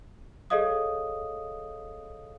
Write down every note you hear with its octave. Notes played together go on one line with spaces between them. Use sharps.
G#4 A4 C#5 D#5 F5 D#6